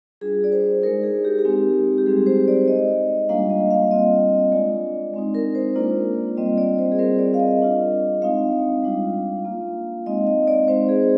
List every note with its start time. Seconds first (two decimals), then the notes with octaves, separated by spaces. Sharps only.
0.21 G3 D4 F4 G#4
0.44 D5
0.52 C5
0.83 G#3 D#4 A#4
1.03 G#4
1.25 G4
1.39 G4
1.45 G#3 C4 D#4
1.98 G4
2.06 G3 C4 D#4 G#4
2.26 C5
2.48 D5
2.68 G#3 D#4 D#5
3.29 G3 A#3 D4 F4 F5
3.50 D#5
3.71 F5
3.91 G3 C4 F4 D#5
4.52 G#3 D4 F4 D5
5.14 G#3 C4 D#4
5.34 A#4
5.55 C5
5.75 A#3 D4 F4 D5
6.37 G3 C4 F4 D#5
6.58 D5
6.79 C5
6.92 G#4
6.99 G3 C4 F4 A#4
7.19 D5
7.34 F5
7.40 D#5
7.60 G3 D4 F4
8.22 G#3 C4 D#4 F5
8.83 G3 D4 F4
9.45 A#3 F4
10.06 G#3 C4 D#4 D#5
10.27 D#5
10.48 D5
10.68 G#3 C4 D#4 C5
10.89 G#4